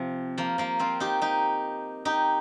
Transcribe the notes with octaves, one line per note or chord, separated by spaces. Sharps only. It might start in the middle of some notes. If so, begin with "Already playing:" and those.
Already playing: C3 F3
F3 A#3
F3 A#3
C4 F4
D#4 G4
D#4 G4
D#4 G4